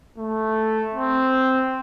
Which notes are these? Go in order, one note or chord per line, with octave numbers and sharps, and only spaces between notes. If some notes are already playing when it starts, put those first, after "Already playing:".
A3
C4